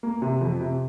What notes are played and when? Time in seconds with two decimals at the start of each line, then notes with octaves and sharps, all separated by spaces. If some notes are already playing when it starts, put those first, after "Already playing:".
0.03 A#3
0.22 C3
0.41 F2
0.61 C3